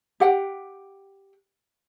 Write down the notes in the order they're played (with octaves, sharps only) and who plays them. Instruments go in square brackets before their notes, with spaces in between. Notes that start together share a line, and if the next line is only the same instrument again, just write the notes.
[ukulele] G4 F#5 G5